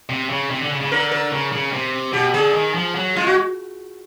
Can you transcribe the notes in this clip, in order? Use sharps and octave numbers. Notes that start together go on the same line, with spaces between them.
C3
C#3
C3
D3
C#3
C#3
D3 A#4
A#4
C#3
C#3
C3
B2 G4
D3 G#4
D#3
F3
F#3
G#3 F4
F#4